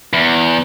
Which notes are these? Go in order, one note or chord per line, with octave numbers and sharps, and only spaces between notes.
E2